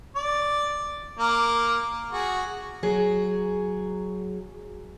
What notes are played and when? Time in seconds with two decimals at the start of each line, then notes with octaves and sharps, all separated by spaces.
0.15 D5
1.19 A#3 A#4 D6
2.12 F#4 G#4
2.83 F#3 G#4